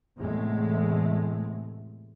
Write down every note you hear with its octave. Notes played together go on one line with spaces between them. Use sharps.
E2 A2 C3 G#3 A3